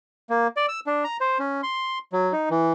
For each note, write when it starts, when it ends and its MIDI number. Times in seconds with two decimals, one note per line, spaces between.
0.30 0.47 58
0.57 0.66 74
0.69 0.80 88
0.87 1.04 62
1.04 1.17 82
1.21 1.38 72
1.39 1.61 61
1.63 1.99 84
2.13 2.32 54
2.33 2.49 63
2.50 2.73 52